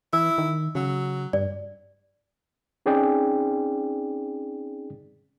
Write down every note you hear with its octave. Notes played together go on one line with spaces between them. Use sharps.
E3 E4 E6
D#3
C#3 F#3
G2 D5
C4 C#4 D#4 G#4 D5 G5